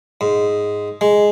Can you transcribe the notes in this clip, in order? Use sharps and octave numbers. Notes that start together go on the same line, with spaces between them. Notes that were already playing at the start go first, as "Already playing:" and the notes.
G#2
G#3